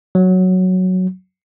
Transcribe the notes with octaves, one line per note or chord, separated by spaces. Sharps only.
F#3